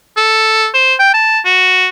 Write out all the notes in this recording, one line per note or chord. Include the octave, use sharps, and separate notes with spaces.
A4
C5
G5
A5
F#4